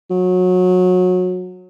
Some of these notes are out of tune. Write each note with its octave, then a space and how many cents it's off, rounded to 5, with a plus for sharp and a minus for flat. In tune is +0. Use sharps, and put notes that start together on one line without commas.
F#3 -25